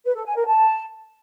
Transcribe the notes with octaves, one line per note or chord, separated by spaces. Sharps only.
B4
A4
G#5
A#4
A5